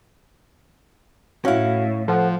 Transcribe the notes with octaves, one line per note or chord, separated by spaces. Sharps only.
A2 C#4 E4 F#4 F5
F3 A4 C5 F#5